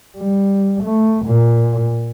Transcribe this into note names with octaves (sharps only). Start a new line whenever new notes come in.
G3
A3
A#2